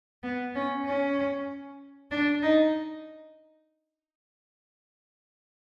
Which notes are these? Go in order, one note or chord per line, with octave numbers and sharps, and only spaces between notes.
B3
C#4
C#4
D4
D#4